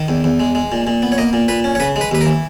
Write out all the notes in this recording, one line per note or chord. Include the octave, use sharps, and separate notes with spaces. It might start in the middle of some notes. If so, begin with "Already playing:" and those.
Already playing: D#3
E2
E2
G#3
G#3
A#2
A#2
B3
C#5
A#3 D#5
A#2
A#2 B4
C#4
C#5
C#3 B4
G#3
B4
D#2 B4
A#4
E3